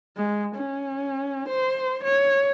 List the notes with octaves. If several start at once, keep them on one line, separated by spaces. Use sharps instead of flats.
G#3
C#4
C5
C#5